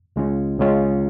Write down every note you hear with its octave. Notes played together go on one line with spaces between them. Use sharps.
C#2 C#3 G#3 C#4 F4
C#2 C#3 G#3 C#4 F4